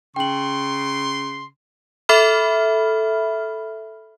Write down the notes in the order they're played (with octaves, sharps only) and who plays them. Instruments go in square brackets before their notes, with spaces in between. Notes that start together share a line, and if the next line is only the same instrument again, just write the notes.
[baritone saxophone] C#3 [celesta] G5 F#7 [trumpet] C6
[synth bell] A4 E5 B5 F6